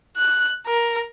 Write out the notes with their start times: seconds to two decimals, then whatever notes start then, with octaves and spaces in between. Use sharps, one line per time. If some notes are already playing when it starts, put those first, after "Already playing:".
0.17 F#6
0.67 A#4